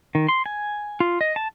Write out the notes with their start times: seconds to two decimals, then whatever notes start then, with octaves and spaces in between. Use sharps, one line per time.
0.15 D#3
0.29 C6
0.46 G#5
1.00 F4
1.21 D#5
1.36 A5